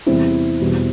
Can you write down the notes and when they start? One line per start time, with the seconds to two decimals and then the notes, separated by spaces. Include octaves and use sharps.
0.06 E2 C3 G3 C4 E4
0.61 E2 B2 G3